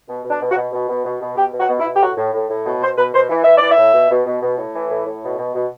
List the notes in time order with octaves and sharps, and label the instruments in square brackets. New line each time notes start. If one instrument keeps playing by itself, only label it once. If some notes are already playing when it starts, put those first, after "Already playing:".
[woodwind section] B2
B2
D4
B2
F#4
B2
B2
B2
B2
B2
B2 G4
B2
F#4
B2
E4
B2
G4
A2 F#4
A2
A2
A2
B2
B2 C5
B2 B4
B2 C5
E3
E3 E5
D5
E3
E5
A2
B2
B2
B2
B2
A2
E3
A2
A2
B2
B2
B2